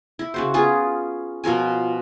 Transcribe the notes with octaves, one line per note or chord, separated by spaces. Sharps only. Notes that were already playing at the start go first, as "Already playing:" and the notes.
E4
C#3 F#4 C5
B3 C#4 F4 G#4
B2 F3 A#4 G#5